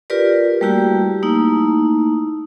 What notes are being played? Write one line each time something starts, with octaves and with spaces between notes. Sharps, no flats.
F4 G4 A#4 B4 D5
G3 A3 A#3 E4 F#4 G4
A3 A#3 D#4 E4